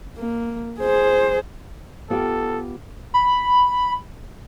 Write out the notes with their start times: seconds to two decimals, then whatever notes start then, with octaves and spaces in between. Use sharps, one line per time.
0.18 A#3
0.80 G#4 C5
2.10 B3 F4 G4 A4
3.14 B5